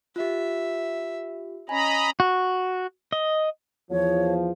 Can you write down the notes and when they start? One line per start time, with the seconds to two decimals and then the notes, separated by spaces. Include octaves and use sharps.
0.16 F4 G4 E5
1.69 C#4 D#5 G#5 A#5 B5
2.20 F#4
3.12 D#5
3.91 E2 F3 C#5